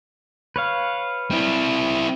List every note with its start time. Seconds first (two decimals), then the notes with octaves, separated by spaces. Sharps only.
0.56 B4 C#5 F5
1.32 C4 E4